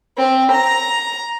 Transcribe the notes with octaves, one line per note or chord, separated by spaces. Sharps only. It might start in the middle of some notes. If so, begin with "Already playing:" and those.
C4
A#5